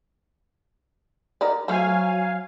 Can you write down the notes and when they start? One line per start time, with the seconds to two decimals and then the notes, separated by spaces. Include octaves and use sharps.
1.41 D#4 A#4 D5
1.68 F3 F#3 A3 F5 G#5